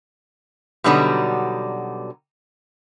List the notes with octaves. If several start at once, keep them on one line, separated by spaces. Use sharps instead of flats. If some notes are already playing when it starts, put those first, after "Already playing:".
B2 D3 F#3 G3 B3 D#4